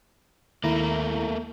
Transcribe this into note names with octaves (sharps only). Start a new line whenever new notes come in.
D#2 A3 A#3 E4 A#5